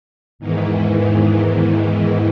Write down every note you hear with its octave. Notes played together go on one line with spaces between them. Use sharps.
E2 G#2 D#3 E3